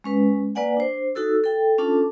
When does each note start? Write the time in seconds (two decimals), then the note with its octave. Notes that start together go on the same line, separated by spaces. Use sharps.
0.04 G#3 C#4 B4
0.55 A#3 B4 D5 F#5 G#5
0.77 D4 C5
1.15 D#4 F#4 A4 E6
1.44 A4 G5
1.78 C#4 D4 F4 A4 A5 D6